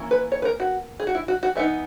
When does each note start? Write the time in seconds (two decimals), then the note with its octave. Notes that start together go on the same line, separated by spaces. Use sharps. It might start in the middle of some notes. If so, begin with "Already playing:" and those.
Already playing: E3 A#3 C#4 E4
0.11 B4
0.32 C#5
0.42 B4
0.45 A#4
0.60 F#4
1.00 G#4
1.07 F#4
1.15 E4
1.28 F#4
1.43 F#4
1.55 E3 B3 D#4 E5